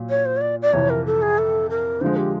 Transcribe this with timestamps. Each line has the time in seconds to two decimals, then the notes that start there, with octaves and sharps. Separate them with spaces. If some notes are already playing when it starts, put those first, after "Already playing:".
Already playing: A#2 F#3
0.10 C#5
0.25 C5
0.37 C#5
0.41 D5
0.62 D5
0.73 F2 C3 E3 C#5
0.90 A#4
1.06 A4
1.22 G#4
1.38 A4
1.70 A#4
2.01 D3 F3 G#3 C5
2.17 G4